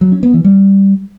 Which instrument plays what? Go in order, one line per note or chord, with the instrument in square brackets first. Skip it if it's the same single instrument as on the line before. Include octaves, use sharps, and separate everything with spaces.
[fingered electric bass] F#3
C#4
B3
E3
G3